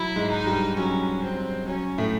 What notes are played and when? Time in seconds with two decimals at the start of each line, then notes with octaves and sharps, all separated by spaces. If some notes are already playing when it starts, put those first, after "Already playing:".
Already playing: F#3 E4
0.16 G#2 G#3
0.31 D#4
0.47 G2 G3
0.77 F#3 C#4
1.23 C4
1.68 F#3 C#4
1.98 A2 A3